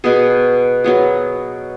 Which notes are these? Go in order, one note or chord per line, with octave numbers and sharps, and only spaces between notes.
B2 B3 G#4
F#3 B3 G#4